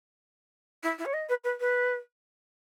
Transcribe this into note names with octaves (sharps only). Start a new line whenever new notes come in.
E4
E4
C#5
D#5
B4
B4
B4